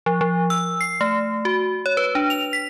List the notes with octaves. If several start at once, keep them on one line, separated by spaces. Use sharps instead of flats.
F3
F3
E6
C7
A3
F#4
C#5
B4
D4
F7
B6